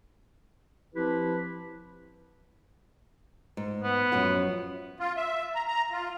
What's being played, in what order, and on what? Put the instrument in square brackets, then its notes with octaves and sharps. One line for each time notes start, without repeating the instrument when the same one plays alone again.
[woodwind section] F3 C4 E4 G4 B4
[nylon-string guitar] G#2
[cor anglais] B3
[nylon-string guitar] F#2 F3 F#4
[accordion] F4
E5
A#5
A#5
F4